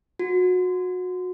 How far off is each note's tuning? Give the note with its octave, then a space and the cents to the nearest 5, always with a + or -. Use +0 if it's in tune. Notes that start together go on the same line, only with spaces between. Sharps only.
F#4 -25